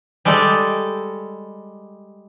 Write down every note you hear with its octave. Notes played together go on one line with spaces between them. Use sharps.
G3 G#3 G4 A4